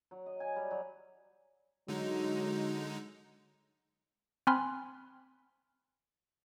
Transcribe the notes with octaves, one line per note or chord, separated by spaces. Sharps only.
F#3
D#5
G#5
G3
F#3
D3 F#3 G#3 D#4
C4 G#5 B5 C6 F6